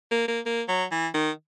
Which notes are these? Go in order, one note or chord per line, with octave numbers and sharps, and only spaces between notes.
A#3
A#3
A#3
F#3
E3
D#3